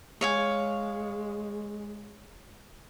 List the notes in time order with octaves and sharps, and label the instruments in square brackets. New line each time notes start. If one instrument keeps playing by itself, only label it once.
[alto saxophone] G#3 [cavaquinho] C#5 F5 G#5